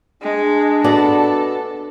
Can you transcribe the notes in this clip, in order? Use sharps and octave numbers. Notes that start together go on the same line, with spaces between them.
G#3 D4
B3 F#4 A4 D5